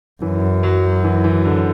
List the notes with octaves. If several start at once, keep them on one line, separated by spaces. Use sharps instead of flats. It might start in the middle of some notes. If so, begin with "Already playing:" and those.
F#2 E3
F#3
E3
E3
D3